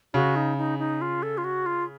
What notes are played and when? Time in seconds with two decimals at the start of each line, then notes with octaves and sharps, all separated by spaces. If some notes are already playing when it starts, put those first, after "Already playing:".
0.14 C#3 F#4
0.36 D#4
0.58 D#4
0.79 D#4
1.01 F4
1.23 A4
1.38 F4
1.44 F#4
1.66 F4